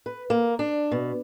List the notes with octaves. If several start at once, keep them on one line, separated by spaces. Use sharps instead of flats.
B4
A#3
D4
B2